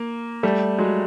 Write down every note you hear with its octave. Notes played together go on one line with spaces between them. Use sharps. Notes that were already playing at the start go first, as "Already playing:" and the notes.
Already playing: A#3
G3 A3
F#3 G#3